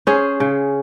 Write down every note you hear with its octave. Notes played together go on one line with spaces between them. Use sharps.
C#4 G#4 C5
C#3